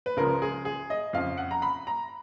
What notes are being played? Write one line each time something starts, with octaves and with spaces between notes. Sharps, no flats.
B4
C#2 C#3 F3 G#3 A#4
G#4
G#4
D#5
F2 C#3 F3 F5
F#5
A#5
B5
A#5